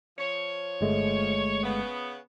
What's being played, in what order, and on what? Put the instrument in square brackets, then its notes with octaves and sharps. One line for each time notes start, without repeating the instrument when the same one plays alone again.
[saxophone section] F3 C#5
[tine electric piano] G1 G#3 A3
[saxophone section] C#3 B3